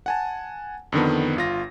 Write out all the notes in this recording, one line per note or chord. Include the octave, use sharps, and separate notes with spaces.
F#5 G#5 A5
F2 D3 D#3 B3
G1 F4 A#6